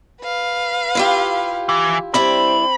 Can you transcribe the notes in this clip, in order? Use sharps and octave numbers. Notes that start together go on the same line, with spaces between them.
B4 F5
E4 F4 G4
E3
G2 C4 E4 D5 B5